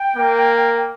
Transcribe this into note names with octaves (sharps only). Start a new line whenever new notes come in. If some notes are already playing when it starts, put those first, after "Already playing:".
Already playing: G5
A#3